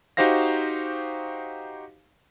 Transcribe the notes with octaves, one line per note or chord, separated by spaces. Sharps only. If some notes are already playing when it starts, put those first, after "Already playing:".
D#4 F#4 G4 C5 F5 A#6